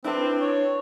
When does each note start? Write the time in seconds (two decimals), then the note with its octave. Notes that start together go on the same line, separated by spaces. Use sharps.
0.04 C4 D4 E4 B4
0.41 C#5